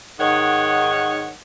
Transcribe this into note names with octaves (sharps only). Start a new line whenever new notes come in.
G#2 D#3 C#5 F#5